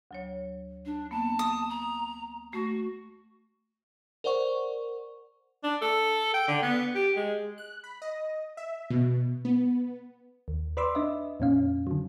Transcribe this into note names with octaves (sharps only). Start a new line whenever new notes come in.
D2 F#3 C#5
D4
A#3 B3 A5
D#6
A#5
A3 F#4
A#4 C5 D5 F#5 C#6
D4
A4
G5
D3
B3
G4
G#3
F#6
B5
D#5
E5
B2
B3
D#2
B4 D5 B5 C6 D6 E6
D4 D#5 E5
F2 A#2 C#4 F5
D3 F#3